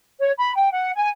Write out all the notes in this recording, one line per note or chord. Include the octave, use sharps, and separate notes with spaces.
C#5
B5
G5
F#5
G#5